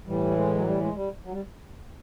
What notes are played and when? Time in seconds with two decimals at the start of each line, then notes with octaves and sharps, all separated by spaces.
0.07 A2 E3 G3
0.36 G#3
0.55 F#3
0.66 G3
0.81 G#3
0.96 G3
1.25 F#3
1.33 G3